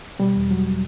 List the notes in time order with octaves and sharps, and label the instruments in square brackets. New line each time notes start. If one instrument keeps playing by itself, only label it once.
[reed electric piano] B2 G3
E2
F#3